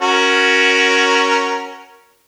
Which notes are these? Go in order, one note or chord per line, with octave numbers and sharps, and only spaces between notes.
C#4 F#4 A#4